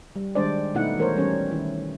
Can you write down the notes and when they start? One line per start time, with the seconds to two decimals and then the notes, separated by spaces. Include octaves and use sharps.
0.16 G3
0.35 D#3 G3 G#3 D4 C5 D5
0.75 B2 A3 B3 D#4 E4 F#5
0.98 E3 A3 A#4 C5 C#5
1.16 E3 G3 C#4 C#5
1.51 D#3 E4